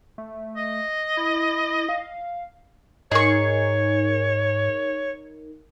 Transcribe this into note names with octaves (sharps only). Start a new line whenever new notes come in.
A3
D#5
E4
F5
G#2 D#4 G#4 A#4 C#5 C#6